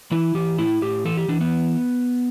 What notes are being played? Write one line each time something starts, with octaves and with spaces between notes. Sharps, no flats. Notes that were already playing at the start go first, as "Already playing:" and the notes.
E3 E4
E3 G4
A2 E4
A2 G4
E3 A4
G4
E3 D4
B3